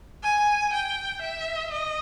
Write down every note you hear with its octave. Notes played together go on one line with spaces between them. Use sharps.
G#5
G5
E5
D#5